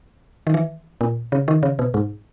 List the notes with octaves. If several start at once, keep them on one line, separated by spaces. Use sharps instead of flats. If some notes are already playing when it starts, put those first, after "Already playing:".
D#3
E3
A#2
C#3
D#3
C#3
B2
G#2